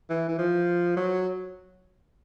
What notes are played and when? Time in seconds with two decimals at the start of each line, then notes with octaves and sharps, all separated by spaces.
0.10 E3
0.28 E3
0.38 F3
0.96 F#3